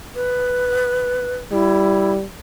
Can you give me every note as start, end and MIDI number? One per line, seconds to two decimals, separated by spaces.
0.15 1.37 71
1.52 2.25 55
1.52 2.13 64